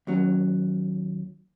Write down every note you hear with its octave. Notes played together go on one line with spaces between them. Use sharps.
D#2 F#3 C#4